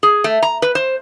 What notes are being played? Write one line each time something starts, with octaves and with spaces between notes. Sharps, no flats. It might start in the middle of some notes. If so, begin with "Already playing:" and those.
G#4
A3
A#5
B4
C5